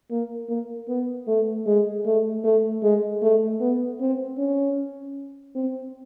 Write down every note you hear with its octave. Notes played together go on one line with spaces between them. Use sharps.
A#3
A#3
B3
A3
G#3
A3
A3
G#3
A3
B3
C4
C#4
C4